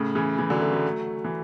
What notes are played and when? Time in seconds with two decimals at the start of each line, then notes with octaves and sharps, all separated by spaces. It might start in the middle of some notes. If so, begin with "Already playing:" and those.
Already playing: A2 C#3
0.15 C#3 E3
0.38 C#3 E3
0.50 D3 F#3
0.62 F#3 A3
0.73 F#3 A3
1.25 E3